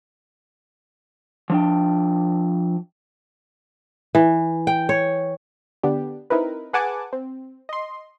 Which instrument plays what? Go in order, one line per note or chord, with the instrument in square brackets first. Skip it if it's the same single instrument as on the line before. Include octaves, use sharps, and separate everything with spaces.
[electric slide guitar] F3 D4 G5
[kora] E3
G5
C#5
[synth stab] D3 B3 D4 G4
C4 D#4 E4 A#4 B4
G#4 B4 F#5 G#5 A5 D6
C4
D#5 C6